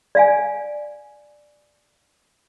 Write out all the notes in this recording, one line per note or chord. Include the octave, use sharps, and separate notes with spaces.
D5 F5 G#5